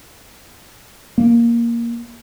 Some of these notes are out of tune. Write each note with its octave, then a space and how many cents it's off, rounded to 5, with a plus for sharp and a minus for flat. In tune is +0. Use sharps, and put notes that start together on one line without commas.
A#3 +5